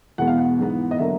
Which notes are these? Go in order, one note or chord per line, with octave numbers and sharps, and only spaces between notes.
E2 B2 G#3 B3 F#5
F5
F#5
G#2 E3 G#3 B3
D#5
D3 F#3 A#3 E5